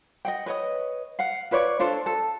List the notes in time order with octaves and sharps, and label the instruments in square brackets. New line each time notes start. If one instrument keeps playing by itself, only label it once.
[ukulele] D#5 F#5 G5
B4 C#5 D#5
F5 F#5
F4 B4 C#5 D5
D4 F4 A4 C5
A4